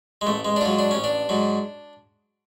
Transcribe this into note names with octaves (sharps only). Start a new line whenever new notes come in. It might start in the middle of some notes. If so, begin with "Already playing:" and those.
G#3
A1 A3
G#3
D4
G#2 F#3 F4
D4
A1 C#4
D4
G#2 F#3